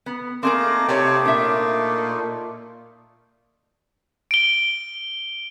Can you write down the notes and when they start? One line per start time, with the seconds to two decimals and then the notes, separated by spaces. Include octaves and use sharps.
0.06 B3
0.43 A3 A#3 C4 D#4 F4 G#4 A#4 D6
0.88 C3 C#5 D5
1.25 A#2 D4 E5
4.31 D7 G7